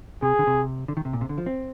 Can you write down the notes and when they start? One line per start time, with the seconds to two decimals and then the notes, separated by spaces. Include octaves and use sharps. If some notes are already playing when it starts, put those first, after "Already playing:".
0.22 C3 G#4
0.39 D3
0.47 C3
0.88 D3
0.97 D#3
1.05 C3
1.13 A#2
1.21 C3
1.29 D3
1.38 F3
1.46 C4